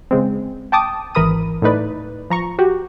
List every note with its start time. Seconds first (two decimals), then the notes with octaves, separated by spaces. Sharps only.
0.11 C#3 G#3 C4
0.72 G5 A5 D6 D#6
1.15 G#1 E3 A#4 B5 D#6 D#7
1.62 A2 A3 D#4 B4 D5
2.30 F3 A#5 C#6
2.59 F#4 G4